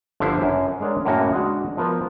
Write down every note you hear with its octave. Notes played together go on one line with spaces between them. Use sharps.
G1 D3 F3 E4 C5
F#2
G#3 D4 A#4 C#5 D5
F#2 A2 C#3 A#3 F#4
G#3 D4 F#4
F3 B3 A#4 B4